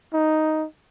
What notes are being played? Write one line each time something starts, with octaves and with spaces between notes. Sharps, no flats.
D#4